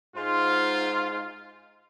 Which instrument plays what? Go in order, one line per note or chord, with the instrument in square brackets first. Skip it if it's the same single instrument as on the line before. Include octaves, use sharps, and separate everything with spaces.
[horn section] G#2 F4